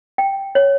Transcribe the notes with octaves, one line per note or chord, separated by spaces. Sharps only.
G5
C#5